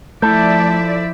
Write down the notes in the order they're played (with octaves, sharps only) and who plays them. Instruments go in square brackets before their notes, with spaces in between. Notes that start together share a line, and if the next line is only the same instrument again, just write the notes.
[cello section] F3 D5 E5 [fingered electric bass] A3 [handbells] E4 G6 [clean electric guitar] A4